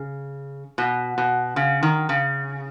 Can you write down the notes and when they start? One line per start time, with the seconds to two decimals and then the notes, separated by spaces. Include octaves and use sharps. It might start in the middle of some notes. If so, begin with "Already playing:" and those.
Already playing: C#3
0.78 B2
1.18 B2
1.56 C#3
1.83 D#3
2.09 C#3